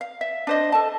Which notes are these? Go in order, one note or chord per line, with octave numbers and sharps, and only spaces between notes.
F5
E5
D4 C5 D#5
A4 A5